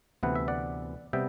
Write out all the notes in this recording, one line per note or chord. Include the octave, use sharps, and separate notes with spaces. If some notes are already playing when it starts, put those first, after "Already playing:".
D2 C3 E3 B3 E4 F#5
E5
D5 F#5
C3 G3 B3 E5 G5